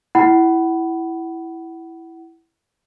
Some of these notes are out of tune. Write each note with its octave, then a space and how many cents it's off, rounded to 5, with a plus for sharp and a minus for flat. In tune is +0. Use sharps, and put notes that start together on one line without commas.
E4 +0 F#5 +30 B5 +0